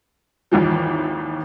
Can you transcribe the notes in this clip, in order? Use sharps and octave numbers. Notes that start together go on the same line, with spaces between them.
G#1 D#2 E3 F3